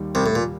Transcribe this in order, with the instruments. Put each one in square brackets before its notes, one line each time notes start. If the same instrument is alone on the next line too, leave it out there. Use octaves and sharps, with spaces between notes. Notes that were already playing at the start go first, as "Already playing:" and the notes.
Already playing: [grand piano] D#2 D#3 G3
[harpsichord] C2 C3
A2
A#2